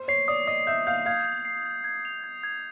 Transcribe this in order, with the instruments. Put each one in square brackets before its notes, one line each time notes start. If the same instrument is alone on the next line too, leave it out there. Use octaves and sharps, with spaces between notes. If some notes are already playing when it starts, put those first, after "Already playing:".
Already playing: [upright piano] C5
[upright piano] C#5 [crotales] C7
[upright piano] D5 [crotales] D#6
[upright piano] D#5 [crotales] D#6
[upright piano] E5 [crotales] G6
[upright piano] F5 [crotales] G6
[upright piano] F5 [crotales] G#6
[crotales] G#6
C7
G#6
G#6
F7
G#6
G#6